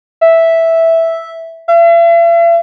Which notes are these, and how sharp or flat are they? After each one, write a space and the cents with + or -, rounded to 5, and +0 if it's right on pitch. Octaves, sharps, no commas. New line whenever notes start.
E5 -5
E5 +45